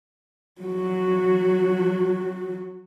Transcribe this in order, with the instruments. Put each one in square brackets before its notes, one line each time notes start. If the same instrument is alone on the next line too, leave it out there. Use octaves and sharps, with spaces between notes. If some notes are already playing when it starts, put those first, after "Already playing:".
[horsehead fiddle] F#3 F#4